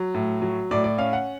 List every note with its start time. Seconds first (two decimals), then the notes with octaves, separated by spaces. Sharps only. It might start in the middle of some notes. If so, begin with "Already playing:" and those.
Already playing: F#3
0.14 A2
0.42 F#3
0.71 A2 D5
0.84 D5
0.98 C#4 F5
1.13 F#5